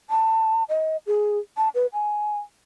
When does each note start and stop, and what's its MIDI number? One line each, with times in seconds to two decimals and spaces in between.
0.10 0.64 81
0.69 0.97 75
1.07 1.39 68
1.57 1.69 81
1.75 1.87 71
1.93 2.38 80